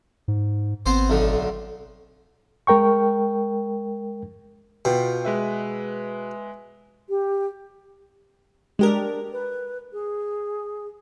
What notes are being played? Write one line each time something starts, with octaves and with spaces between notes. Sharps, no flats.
G#2
G#1 B3 C4 C5
B1 A2 D3
G#3 A#4 G5 C#6
B2 F4 F5 G5
G#3 B4 E5
G4
G#3 D4 G4 A#4
B4
G#4